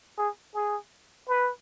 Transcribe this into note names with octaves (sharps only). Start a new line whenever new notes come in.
G#4
G#4
B4